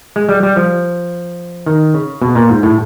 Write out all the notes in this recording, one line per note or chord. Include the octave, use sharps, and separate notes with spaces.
G#3
G3
G3
F3
D#3
C#3
B2
A#2
G#2
A2